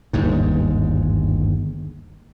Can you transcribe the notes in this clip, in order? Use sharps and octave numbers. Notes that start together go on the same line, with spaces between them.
G1 D#2 G#2